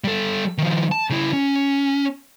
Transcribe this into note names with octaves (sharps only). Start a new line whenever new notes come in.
G3 A4
D#3 F3
A5
C#3 E4
C#4